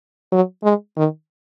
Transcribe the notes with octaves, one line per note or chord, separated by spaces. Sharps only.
F#3
G#3
D#3